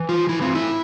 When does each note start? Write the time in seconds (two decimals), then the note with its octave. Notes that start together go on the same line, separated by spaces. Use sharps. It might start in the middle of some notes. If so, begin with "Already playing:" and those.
Already playing: E3
0.09 F4
0.28 A2 E3 E4
0.42 C4
0.55 E4